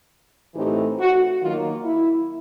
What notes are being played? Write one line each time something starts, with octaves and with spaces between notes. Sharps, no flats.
A2 E3 A3 C4 D#4 G4
F#4
D#3 F#3 A#3 F4
E4